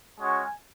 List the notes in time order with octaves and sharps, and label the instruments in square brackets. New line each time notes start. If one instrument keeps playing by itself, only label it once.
[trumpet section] G#3 C#4 F#4 G#5